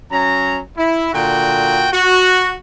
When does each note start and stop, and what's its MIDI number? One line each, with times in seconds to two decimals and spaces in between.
0.11 0.60 54
0.11 0.60 61
0.11 0.60 82
0.77 1.11 64
1.13 1.88 46
1.13 1.88 50
1.13 1.88 66
1.13 1.88 79
1.93 2.53 66